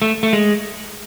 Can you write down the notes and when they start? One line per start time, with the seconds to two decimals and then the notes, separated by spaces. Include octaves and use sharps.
0.02 A3
0.23 A3
0.33 G#3